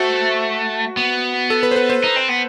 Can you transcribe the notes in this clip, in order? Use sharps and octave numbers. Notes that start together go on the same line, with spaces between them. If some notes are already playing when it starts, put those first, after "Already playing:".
Already playing: A3 F#4 C5 E5
B3
A4
B4
C5
B4
C5
D#4
C4
B3